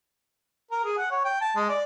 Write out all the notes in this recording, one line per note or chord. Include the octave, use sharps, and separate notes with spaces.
A#4
G#4
F#5
C#5
G5
A5
G#3
D5